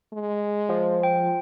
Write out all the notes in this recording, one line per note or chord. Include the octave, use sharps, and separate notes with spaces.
G#3
F3
G5